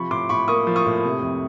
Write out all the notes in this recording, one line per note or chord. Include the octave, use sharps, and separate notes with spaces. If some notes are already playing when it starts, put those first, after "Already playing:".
Already playing: C3 F3 B5 C#6
A2 C6 D6
A2 B5 C#6
A#3 C#6 D#6
F3
C#6 D#6
A2
C3
F2